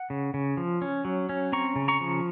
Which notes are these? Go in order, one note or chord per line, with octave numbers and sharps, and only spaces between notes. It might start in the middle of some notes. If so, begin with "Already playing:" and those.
Already playing: F#5
C#3
C#3
F3
C#4
F#3
C#4
C4 A#5 C#6
C#3
A#5 C#6
F3